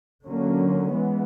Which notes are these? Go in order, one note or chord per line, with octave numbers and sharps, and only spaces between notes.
D3 F#3 A#3 C#4
E3 G#3 B3